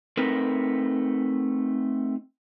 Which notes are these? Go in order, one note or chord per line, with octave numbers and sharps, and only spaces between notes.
A3 C4 D#4 A#4 B4